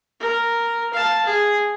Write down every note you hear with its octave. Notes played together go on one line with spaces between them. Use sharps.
A#4
F5 A5
G#4